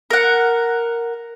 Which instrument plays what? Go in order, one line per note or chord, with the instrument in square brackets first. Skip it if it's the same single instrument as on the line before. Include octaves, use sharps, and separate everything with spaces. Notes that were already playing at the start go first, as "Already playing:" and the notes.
[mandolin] A#4 F#5